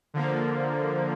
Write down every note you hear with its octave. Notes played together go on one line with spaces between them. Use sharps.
D3 F3 A#3